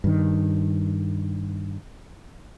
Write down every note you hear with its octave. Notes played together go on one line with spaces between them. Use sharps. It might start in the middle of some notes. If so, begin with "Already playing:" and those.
G2 D#3